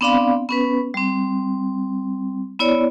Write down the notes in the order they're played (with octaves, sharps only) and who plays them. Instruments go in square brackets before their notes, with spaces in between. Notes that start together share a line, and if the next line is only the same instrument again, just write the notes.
[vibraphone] B3 C4 D4 D5 F5 B5
B3 C#4 B4
G3 C4
B3 E4 C#5 D5